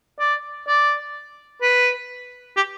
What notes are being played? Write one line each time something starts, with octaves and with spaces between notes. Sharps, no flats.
D5
D5
B4
G4